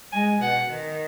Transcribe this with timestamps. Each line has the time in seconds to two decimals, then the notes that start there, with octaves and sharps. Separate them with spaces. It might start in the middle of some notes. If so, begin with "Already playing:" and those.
0.12 G#3 G#5
0.41 B2 F#5
0.69 D#3